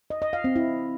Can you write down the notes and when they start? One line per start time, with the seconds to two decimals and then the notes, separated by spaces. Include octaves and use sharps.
0.10 D#5
0.22 D#5
0.33 F5
0.44 C4
0.56 E4